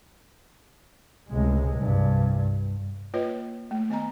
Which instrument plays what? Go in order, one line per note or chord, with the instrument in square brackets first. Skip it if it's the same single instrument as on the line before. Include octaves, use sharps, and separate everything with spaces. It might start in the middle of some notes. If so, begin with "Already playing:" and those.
[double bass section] C#2 A2 C3 G#3
C2 G2
[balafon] A#3 F4 B4 C#5 D#5
A3
D#3 B3 D#5 G#5 A#5